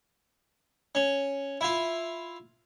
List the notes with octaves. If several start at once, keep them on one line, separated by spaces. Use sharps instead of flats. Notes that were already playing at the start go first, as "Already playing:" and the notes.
C#4
E4 F4